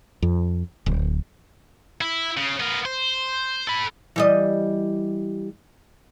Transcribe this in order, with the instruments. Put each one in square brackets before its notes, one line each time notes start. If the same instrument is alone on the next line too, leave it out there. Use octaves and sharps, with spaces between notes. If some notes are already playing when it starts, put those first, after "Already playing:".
[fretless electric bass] F2
D1
[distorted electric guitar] E4
C#3
B3 A#4
C5
A4 B5
[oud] E3 G3 D#5